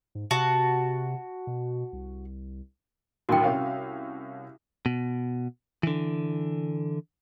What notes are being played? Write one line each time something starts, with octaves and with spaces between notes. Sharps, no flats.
G#2
C3 F#4 A5
B2
C2
D#2 A2 D3 F#4 G5
C2 C#4 F5
B2
D3 E3